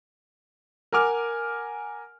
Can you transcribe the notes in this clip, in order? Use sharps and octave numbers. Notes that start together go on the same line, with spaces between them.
A#4 F#5 G#5 D6 F6